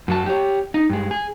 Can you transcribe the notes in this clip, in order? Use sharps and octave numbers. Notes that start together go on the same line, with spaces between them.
F#2 F#3 A5
G4 C#5
D#4
G2 G#3
G#4